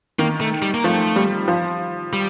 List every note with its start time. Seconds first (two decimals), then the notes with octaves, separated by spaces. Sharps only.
0.19 D#3 A#3
0.41 A3
0.62 G3
0.74 A#3
0.84 F3 A3
1.16 G3
1.48 F3
2.13 G3